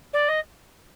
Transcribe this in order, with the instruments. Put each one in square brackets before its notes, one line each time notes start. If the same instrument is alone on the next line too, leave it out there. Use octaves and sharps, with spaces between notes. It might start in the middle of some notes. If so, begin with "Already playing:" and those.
[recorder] D5
D#5